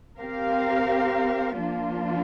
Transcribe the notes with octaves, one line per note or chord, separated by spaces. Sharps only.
C4 G4 A#4 F5
F3 A#3 D4 F4